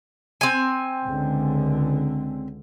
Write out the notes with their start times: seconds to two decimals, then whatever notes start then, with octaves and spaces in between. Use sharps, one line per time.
0.41 C4 G#5
1.06 C#2 D3